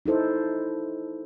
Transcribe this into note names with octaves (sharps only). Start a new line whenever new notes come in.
D#4 E4 A4 C5